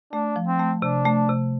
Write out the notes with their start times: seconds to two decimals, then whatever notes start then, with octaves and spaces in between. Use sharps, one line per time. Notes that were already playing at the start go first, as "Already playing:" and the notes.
0.13 A3 D4
0.36 F3
0.47 C4
0.60 A3
0.82 C3 D4
1.05 A3
1.29 C3